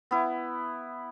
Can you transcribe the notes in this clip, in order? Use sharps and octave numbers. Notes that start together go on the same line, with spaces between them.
B3 E4